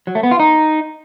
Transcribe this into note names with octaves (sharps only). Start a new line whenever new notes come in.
F#3
A3
B3
F4
D#4